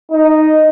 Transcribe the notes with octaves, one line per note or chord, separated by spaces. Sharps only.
D#4